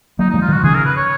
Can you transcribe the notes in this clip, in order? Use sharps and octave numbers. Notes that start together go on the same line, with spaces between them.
F#3 A#3 D#4
D#4
F3 G#3
F4
D#3 F#3
F#4
C#3 F3 G#4
A#4
B4
C#5